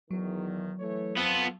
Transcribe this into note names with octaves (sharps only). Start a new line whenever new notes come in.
E2 D#3 F#3
E3 A3 C#5
B3 C4 F4 A4